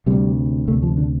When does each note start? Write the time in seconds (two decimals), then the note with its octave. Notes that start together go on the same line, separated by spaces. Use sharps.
0.06 D2 C3 G3
0.67 D2 C3 A3
0.83 F3
0.97 D3